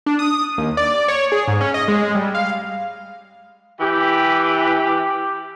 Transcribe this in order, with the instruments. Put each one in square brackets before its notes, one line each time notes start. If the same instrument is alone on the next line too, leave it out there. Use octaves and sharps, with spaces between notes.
[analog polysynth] D4
D#6
D#2
D5
C#5
G#4
G#2
C#4
D#5
G#3
G3
F5
[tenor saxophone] E3 [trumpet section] G4